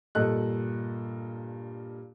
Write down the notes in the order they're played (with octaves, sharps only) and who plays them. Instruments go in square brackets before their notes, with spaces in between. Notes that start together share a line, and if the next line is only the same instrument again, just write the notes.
[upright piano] G2 A#2 A4 D#5 F#6